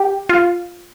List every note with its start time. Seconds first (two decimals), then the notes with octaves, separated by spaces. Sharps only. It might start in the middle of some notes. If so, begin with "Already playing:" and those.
Already playing: G4
0.29 F4